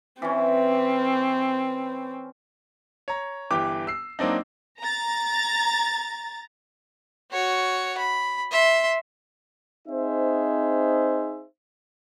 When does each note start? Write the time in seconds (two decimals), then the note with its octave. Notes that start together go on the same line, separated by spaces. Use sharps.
0.22 E3 C4 C#4
3.08 C#5 A#5
3.51 G1 E3 G4 G5 D6
3.87 E6 C7
4.19 F#3 A#3 C4 D4 D#4
4.79 A#5 A6
7.32 F#4 C#5
7.98 B5
8.51 E5 C6
9.88 C4 D#4 G#4 C5 E5